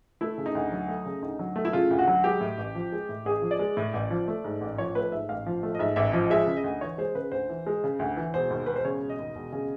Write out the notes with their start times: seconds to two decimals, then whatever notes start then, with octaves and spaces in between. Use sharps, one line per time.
0.21 A3 E4
0.38 C#3
0.46 D#4
0.55 D2
0.72 F#3
0.88 A3
1.06 C#3
1.22 D2 D#4
1.39 F#3
1.56 A3
1.65 E4
1.73 C#3 F4
1.91 D2
1.99 F#4
2.08 F#3
2.24 G#3 G4
2.41 A2
2.58 A1
2.75 F3
2.92 G#3
3.09 A2
3.25 A1 G#4
3.42 F3
3.51 D5
3.59 G#3
3.77 A2
3.94 A1
4.10 F3
4.28 A3
4.44 G#2
4.61 A1
4.78 F3 C#5
4.95 A3 B4
5.12 G#2 E5
5.29 A1 F5
5.46 F3
5.63 A3
5.75 D#5
5.79 G#2 E5
5.96 A1 E5
6.13 F3 D#5
6.30 G#3 E5
6.47 C#3
6.57 D#5
6.64 D2
6.81 E3 C#5
6.98 G#3 C5
7.15 C#3 B4
7.32 D2 C5
7.50 E3
7.67 G#3
7.84 C#3
7.99 D2
8.17 E3
8.34 E1 C5
8.50 D#2
8.66 E1 B4
8.76 C5
8.85 C#3 C#5
9.02 E1
9.09 D#5
9.19 D#2
9.35 E1
9.52 C#3